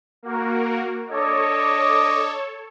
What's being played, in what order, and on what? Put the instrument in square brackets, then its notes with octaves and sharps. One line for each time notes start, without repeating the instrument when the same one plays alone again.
[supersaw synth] A#3 F#4 A#4
[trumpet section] D4 D#5 D6 [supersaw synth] A4 C#5